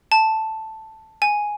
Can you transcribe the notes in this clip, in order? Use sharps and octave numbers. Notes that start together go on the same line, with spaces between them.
A5
G#5